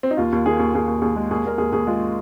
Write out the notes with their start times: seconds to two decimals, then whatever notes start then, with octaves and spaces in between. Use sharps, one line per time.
0.03 C4
0.11 D#4
0.17 D#2 F4
0.32 D#2
0.46 D#3 G#4
0.59 D#2
0.74 D#2 G#4
0.88 D#2
1.02 D#2 G#4
1.16 G#3
1.31 D#2 G#4
1.45 D#2 A#4
1.58 D#2 G#4
1.72 D#2 G#4
1.87 G#3 F4